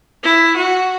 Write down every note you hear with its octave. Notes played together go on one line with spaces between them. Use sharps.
E4
F#4